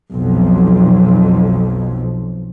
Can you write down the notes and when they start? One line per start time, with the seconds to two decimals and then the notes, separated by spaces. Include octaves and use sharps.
0.12 B1 F2